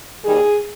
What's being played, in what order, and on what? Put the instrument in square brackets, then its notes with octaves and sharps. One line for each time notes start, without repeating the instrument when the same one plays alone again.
[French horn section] D#2 D#3 G3 G#4